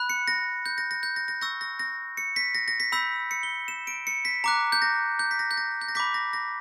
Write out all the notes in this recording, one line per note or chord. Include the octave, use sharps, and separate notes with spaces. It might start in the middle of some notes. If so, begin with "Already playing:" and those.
Already playing: B5 F#6
C#7
A#6
G6
A#6
A#6
G6
A#6
A#6
C#6 E6 G6 A#6
A#6
A#6
C#7
B6
A#6
A#6
B6
B5 E6 G6 B6
C#7
G7
E7
D7
C#7
B6
A#5 D6 F#6
G6
A#6
G6
B6
A#6
G6
A#6
G6
A#6
B5 D6 G6 B6
A#6
A#6